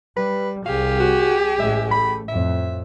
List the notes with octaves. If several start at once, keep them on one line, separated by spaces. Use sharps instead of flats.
G3 B4
C2 G4 G#4 F5
F#4
A1 G#3 E5
A3 B5
F2 A2 E5